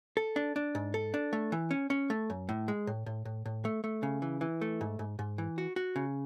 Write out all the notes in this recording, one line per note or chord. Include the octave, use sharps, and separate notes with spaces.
A4
D4
D4
G#2
A4
D4
A3
E3
C#4
C#4
A3
F#2
A2
G#3
A2
A2
A2
A2
A3
A3
C#3
E3
E3
A3
G#2
G#2
G#2
E3
F#4
F#4
C#3